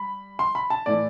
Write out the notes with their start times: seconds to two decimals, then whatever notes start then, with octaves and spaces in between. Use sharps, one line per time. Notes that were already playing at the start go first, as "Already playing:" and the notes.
Already playing: G3 B5
0.39 C6
0.55 B5
0.70 A5
0.86 A2 E3 A3 E4 D5